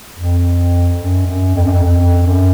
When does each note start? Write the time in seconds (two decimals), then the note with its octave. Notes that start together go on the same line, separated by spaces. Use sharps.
0.15 F2
0.99 F#2
1.27 F#2
1.55 F2
1.65 F#2
1.74 F2
1.84 F2
2.26 F#2